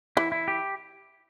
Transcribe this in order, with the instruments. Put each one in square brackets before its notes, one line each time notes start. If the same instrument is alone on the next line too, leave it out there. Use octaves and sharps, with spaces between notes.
[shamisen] E3 [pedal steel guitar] E4
[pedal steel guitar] E4
G4